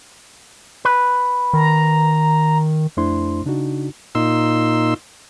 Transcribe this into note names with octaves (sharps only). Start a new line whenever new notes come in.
B4
D#3 A#5
F2 A3 D4 E4 C5 C6
C#3 D4 D#4 F#4
A#2 D#4 C6 E6